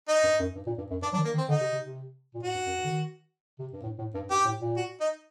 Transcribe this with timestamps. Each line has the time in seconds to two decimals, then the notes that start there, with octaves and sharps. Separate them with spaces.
0.08 D#4
0.24 G2
0.40 F#2
0.55 G2
0.67 A#2
0.78 G2
0.91 F#2
1.02 G2 D4
1.13 F#3 D4
1.18 D#3
1.25 A#3
1.34 D#3
1.38 C4
1.49 D3 D#4
1.61 C3
1.72 C3
1.84 C3
2.34 A#2
2.43 A2 F#4
2.55 G2
2.66 F#2
2.78 G2
2.84 D3
2.89 D#3
3.59 C3
3.73 G2
3.83 A2
3.99 A2
4.15 G2
4.30 G2 G4
4.45 A2
4.61 A#2
4.77 F#4
5.00 D#4